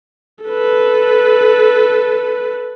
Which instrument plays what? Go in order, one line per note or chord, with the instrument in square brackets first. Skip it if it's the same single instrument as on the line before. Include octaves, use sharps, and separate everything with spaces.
[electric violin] A4 B4